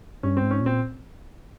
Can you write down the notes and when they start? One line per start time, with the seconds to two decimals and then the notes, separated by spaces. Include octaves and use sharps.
0.23 G2 C#4
0.37 C4
0.42 G#2
0.51 C#4
0.61 A#2
0.66 C4